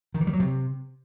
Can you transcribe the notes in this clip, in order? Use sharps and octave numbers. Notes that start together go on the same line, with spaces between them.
D#3
E3
G3
F#3
C3